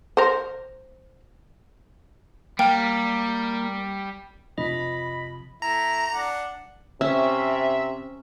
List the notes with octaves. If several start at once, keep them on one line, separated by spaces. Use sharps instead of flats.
A#4 C5
G3 A#3 F5 G5
F2 C3 F3 D#5 B5
A3 E4 A#5
D4 F#5 D6
C3 C#4 E5